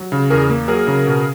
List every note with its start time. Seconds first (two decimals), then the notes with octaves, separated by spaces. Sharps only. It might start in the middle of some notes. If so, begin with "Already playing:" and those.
Already playing: F#3
0.12 C#3
0.30 E2 G#4 A#4
0.50 A#3
0.68 F#3 G#4 A#4
0.87 C#3
1.06 B2